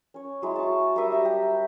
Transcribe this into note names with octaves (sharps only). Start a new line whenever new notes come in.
C#4 C#5
F#3 G#3 E4
A5 C#6
G3 A#4 E5 D#6
G4 E5 A#5
G4